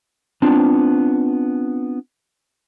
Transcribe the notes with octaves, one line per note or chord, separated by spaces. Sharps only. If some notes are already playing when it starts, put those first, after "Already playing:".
B3 C4 D4 F4